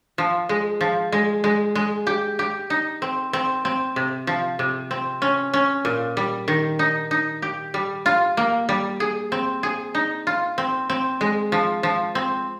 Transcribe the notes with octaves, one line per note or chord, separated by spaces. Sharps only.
F3
G#3
F3
G#3
G#3
G#3
G4
G4
D#4
C4
C4
C4
C3
F3
C3
C4
C#4
C#4
A#2
G3
D#3
D#4
D#4
G4
G3
F4
A#3
G3
G#4
C4
G#4
D#4
F4
C4
C4
G#3
F3
F3
C4